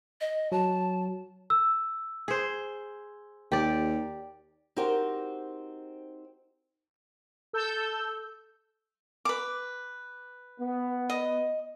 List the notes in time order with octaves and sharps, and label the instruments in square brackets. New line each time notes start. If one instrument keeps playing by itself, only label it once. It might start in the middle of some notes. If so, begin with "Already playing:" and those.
[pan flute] D#5
[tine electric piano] F#3 [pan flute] A5
[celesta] E6
[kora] G#4 C5
[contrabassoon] D#2 [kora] G4 D5
[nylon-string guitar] C4 D#4 F#4 G4 A#4 C5
[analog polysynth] A4 E6 G6
[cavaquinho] B4 D6
[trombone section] B3
[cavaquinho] D#5